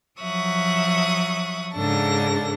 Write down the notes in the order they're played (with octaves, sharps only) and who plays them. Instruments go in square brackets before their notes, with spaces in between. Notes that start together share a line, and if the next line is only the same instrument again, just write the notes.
[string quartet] F3 F#3 E5 C#6 D#6 F#6
G#2 C#3 D4 A4 A5 A#6